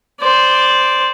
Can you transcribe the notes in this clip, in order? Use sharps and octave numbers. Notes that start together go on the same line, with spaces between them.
C5 D5